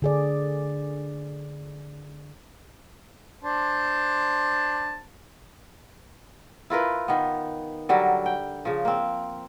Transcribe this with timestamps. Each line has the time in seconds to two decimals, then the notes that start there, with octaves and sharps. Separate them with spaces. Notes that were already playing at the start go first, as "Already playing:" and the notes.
0.02 D3 G#4 D5
3.43 D4 C5 A5
6.70 E4 F4 A#4 B4
7.08 D#3 B3
7.89 D3 F#3 G3 A#4
8.26 G5
8.65 C#3 F3
8.85 A#3 C4